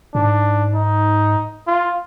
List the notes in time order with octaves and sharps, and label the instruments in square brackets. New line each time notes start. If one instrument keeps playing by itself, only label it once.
[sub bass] G#2 [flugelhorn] D4
[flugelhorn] D#4
F4